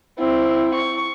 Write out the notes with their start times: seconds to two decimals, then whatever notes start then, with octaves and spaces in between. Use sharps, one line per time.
0.19 C4 E4
0.75 C#6